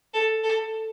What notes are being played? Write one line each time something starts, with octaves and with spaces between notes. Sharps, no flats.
A4
A4